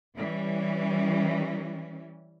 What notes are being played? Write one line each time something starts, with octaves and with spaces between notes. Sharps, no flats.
E3 G3 C#4